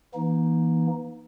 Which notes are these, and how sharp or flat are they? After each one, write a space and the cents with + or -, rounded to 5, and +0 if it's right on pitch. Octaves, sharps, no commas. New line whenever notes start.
E3 +0 A#3 +40 D#4 +0